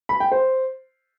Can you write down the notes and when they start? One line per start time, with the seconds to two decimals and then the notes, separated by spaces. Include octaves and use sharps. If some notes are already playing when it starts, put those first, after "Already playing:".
0.09 B5
0.20 G5
0.32 C5